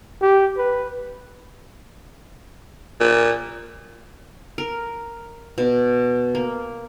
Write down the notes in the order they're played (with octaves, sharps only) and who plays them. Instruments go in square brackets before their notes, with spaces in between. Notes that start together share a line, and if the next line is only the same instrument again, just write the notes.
[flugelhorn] G4
B4
[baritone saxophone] A#2
[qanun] A#4
B2
A#3